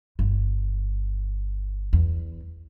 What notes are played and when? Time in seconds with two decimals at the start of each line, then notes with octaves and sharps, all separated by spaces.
0.19 G1
1.93 E2